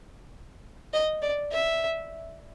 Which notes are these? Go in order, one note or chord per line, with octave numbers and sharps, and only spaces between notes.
D#5
D5
E5